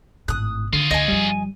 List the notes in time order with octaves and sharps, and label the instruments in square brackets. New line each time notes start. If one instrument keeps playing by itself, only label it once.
[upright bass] G#1 A2 [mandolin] D#6 F#6
[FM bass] D3 [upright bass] D#3 [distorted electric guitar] F4 G#4
[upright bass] D2 [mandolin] D#5 G#5
[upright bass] G1 F3 [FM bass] G3